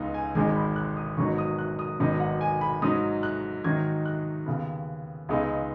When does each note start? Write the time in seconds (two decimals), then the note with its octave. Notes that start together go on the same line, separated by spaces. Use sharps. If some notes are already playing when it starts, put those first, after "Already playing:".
Already playing: C#2 C#3 B3 D#4
0.14 G#5
0.35 G#1 G#2 G#3 D#4 G#5
0.56 B5
0.76 F#6
0.97 D#6
1.17 G#1 G#2 F#3 B3 D#4 C#6
1.38 D#6
1.59 F#6
1.79 D#6
2.00 G#1 G#2 F#3 B3 D#4
2.20 F#5
2.41 G#5
2.61 B5
2.82 G#2 F#3 D#4 D#6
3.23 F#6
3.64 G#2 D#3 F#3 D#4 G#6
4.06 F#6
4.46 D#2 C#3 B3
5.29 C#2 C#3 G#3 B3 D#4